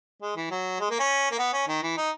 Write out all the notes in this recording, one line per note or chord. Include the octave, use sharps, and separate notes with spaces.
G#3
E3
F#3
G#3
A#3
C#4
A#3
B3
C#4
D#3
E3
D#4